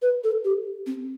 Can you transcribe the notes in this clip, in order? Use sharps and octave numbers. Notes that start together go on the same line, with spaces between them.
B4
A4
G4
C4